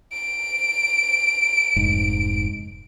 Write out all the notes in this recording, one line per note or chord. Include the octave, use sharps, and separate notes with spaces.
D7
F1 G#2